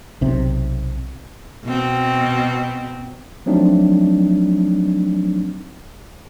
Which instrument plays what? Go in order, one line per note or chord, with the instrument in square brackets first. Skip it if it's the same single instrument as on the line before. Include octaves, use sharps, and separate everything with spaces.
[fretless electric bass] B1 C3
[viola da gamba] B2 C4
[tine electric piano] F3 F#3 A3 C4 D4 D#4